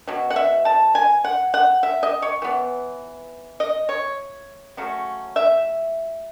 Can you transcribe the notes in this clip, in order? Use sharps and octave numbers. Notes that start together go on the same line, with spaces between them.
B2 F#3
F#5
E5
A5
G#5
F#5
F#5
E5
D#5
C#5
E3 B3
D#5
C#5
C#3 F#3 A3 C#4
E5